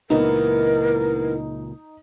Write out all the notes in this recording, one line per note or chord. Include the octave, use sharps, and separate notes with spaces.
C#2 A#2 E3 B3 D#4 A#4